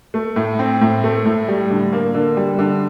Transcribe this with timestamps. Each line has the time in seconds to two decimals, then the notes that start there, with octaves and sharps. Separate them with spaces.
0.14 A3
0.36 A2
0.59 C4
0.81 A2
1.04 A3
1.25 A2
1.48 G3
1.70 D3
1.93 A#3
2.14 D3
2.37 G3
2.59 D3